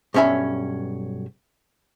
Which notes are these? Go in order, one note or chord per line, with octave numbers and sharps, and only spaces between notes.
B1 G2 C#4 E5 B5